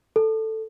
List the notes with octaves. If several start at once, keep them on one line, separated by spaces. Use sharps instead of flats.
A4